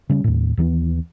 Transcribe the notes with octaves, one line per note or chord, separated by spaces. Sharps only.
C#3 G3 C#4
D#2 A2
D#2 E3 F3 B3